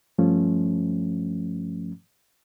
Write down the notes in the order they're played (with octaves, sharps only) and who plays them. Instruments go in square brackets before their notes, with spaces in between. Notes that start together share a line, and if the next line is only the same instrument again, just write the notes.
[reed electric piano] G2 F3 A3 C#4